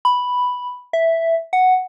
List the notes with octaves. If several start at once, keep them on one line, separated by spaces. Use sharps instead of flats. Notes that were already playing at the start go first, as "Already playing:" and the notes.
B5
E5
F#5